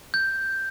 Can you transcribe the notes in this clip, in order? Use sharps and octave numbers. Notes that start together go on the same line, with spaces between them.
G6